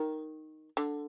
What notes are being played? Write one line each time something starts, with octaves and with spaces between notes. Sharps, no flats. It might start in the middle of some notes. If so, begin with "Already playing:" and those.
Already playing: D#3
D3